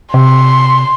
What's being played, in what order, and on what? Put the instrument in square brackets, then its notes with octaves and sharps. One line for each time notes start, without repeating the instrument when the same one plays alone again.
[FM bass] C3 [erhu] C6